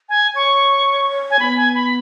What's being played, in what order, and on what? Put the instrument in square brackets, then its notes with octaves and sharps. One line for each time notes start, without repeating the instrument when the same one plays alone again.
[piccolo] G#5
[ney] C#5 [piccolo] C#6
[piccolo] G#5
[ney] B3 [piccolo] B5
[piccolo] G#5
B5